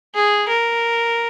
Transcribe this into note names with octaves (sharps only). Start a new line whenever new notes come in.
G#4
A#4